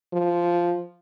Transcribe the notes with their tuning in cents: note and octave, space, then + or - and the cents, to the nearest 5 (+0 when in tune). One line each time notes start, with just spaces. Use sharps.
F3 -5